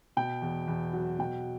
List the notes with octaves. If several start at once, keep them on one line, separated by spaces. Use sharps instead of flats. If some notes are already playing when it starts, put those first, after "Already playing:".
B2 G5
E2
E2
F#3
B2 G5